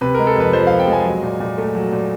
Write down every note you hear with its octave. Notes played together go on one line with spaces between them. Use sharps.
C3 B4
G#3 A#4
A4
F2 B4
F3 C5
C3 F5
G5
G#3
G#5
F#3
A#2
A#2
A3
F#3
A#2